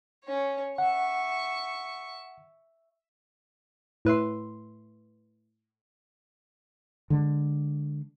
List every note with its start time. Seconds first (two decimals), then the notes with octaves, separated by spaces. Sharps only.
0.24 C#4 C#5
0.78 E5 F#5 C#6
4.05 A2 B4 E5 C6
7.10 D3 G#3